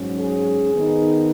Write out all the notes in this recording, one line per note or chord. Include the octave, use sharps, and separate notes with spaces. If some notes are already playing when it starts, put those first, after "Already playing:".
Already playing: G#2 F#3 C#4
G#4
D#3 B3 D#4